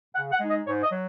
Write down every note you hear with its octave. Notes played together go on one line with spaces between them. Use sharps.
C#3 F#5
F#5
G#3 D#4
D#5
G#2 C#5
D#5
F#3